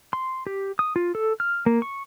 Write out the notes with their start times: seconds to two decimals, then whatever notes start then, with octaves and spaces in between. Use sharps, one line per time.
0.13 C6
0.47 G4
0.79 D#6
0.96 F4
1.15 A4
1.40 F6
1.66 A#3
1.82 C#6